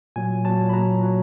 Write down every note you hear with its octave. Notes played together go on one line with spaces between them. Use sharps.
A#2 F#3 G#5
A#2 F#3 A5
B5
A#2 F#3 A#5
A#2 F#3